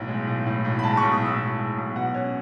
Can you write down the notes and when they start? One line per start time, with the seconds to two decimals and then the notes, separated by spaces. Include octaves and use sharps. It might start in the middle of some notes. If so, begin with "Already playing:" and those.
Already playing: B1 A2
0.09 G#3
0.27 B1
0.46 A2
0.65 B1
0.79 B5
0.83 G#3 A5
0.97 B1 C#6
1.12 D#6
1.21 A2 E6
1.39 B1
1.58 G#3
1.77 B1
1.96 B2 F#5
2.14 C#4